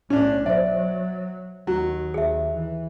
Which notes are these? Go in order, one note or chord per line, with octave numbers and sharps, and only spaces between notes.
B1 A2 C#4 D4
F#3 C5 D5 E5
D#2 D#3 F#3
D#2 G#4 E5
E3